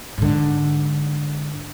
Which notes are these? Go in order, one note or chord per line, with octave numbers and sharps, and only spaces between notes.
G#2 D3